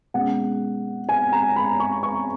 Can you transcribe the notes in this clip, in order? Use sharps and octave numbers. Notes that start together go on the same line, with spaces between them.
B2 G#3 C#4 F#5
G#5
A#5
B5
C#6
C#6